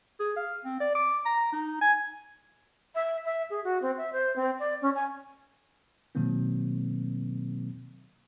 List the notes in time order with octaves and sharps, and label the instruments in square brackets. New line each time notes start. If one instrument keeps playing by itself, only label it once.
[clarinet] G#4
F5
C4
D5
D6
A#5
D#4
G#5
[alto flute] E5
E5
G#4
F#4
C4
E5
C5
C4
D5
C#4
G#5
[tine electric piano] B2 D#3 F#3 A#3 C4